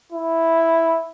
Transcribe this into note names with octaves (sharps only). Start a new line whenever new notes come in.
E4